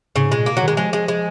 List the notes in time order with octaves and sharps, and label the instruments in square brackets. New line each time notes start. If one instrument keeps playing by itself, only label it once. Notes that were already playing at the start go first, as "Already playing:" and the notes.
[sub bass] G#2 [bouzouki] C#3
[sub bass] A#2 [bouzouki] G#3
[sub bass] B2 [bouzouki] A#3
[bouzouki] F#3
[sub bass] D#3 [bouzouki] G#3
[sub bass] F3 [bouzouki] G#3
[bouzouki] G#3
G#3